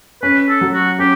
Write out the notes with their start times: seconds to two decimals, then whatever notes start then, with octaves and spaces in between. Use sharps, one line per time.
0.23 C#4 B4
0.49 A4
0.61 F#3
0.74 F#4
0.99 C#4 G4